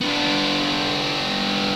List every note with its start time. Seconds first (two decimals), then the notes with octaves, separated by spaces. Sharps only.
0.01 B3 D4